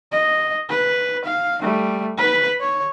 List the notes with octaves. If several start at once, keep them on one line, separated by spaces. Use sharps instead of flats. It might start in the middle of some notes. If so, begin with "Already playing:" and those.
D#5
B4
F5
G3 A3
B4 B5
C#5